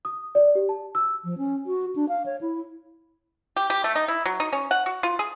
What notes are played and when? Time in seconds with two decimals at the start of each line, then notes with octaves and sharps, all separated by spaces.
0.05 D#6
0.35 D5
0.55 G4
0.69 A5
0.95 E6
1.24 F3
1.38 C#4
1.66 F#4
1.96 D4
2.09 F5
2.26 C#5
2.41 E4
3.56 G4
3.70 G4
3.84 A3
3.95 D#4
4.08 E4
4.26 F#3
4.40 D#4
4.53 C#4
4.71 F#5
4.86 F#4
5.03 F4
5.19 G#4